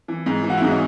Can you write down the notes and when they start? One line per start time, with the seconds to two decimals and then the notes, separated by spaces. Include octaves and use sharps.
0.08 E3
0.26 G#2
0.43 E3
0.50 F#4
0.57 E4
0.62 G#2 D#4
0.71 C#4